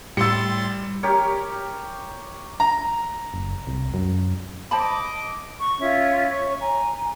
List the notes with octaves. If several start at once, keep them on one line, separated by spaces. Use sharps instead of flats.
A2 G3 C6 E6 A6 C#7
G4 A#4 C#5
A#5
F#1
C2
F#2
C5 D#5 A5 B5 D6
C#6
C#4 F4 E5
C#5 C#6
G#5 A#5